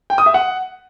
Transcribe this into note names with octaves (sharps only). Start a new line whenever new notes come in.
G5
D#6
E5
F#5